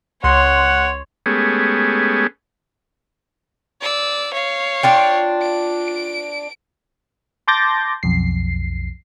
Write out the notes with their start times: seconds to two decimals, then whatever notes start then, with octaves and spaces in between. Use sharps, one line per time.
0.24 C#2 C#5 F#5 C6
1.26 G#3 A3 B3 C#4 G4 G#4
3.81 D5 E6
4.33 C#5 F5
4.83 D4 F4 G5
5.42 D7
7.48 A5 C6 D6 G6 A6 A#6
8.03 B1 F2 C7